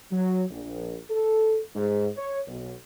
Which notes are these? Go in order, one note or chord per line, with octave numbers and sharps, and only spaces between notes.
F#3
A#1
A4
G#2
C#5
B1